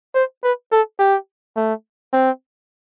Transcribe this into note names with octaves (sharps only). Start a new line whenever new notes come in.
C5
B4
A4
G4
A3
C4